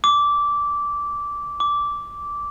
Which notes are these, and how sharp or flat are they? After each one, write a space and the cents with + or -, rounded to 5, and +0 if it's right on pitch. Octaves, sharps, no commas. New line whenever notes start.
D6 -15
D6 -10